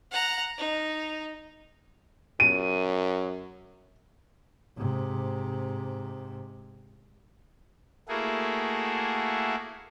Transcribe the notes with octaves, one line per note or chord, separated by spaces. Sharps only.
F#5 A#5
D#4
F#2 D#7
G#2 C3
A3 A#3 E4 F#4 G#4